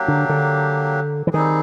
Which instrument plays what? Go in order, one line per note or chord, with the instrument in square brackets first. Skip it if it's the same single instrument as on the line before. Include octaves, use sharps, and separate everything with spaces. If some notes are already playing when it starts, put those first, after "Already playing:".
Already playing: [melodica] F#3 A#3 D4 G4
[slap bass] D3
D3
E3
[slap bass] D#3 [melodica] G3 C4 D#4 G#4